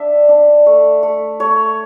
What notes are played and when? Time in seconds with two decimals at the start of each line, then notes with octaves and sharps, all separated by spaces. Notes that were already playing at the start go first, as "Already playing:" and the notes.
Already playing: D4 E5
0.29 D4
0.66 A3
1.03 A3
1.40 A3 C#5